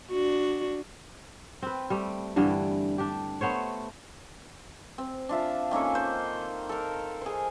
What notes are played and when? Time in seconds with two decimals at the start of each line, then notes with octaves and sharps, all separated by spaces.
0.11 D4 F#4
1.62 C4 B4
1.90 G3 A3
2.36 G2 D3 E3 G3
2.98 D4 G4
3.41 A3 B3 C5 C#5
4.98 C4
5.29 D4 F4 E5
5.71 D#3 A#3 C#4 A4
5.95 C5
6.69 A4 A#4
7.21 G#4 C5